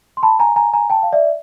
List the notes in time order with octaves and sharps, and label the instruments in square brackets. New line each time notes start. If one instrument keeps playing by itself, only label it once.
[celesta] C6
A5 B5
G#5 A#5
G#5 A#5
G#5 A#5
G5 A5
F5
D5 E5